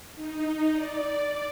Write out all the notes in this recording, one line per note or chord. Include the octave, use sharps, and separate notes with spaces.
D#4
D5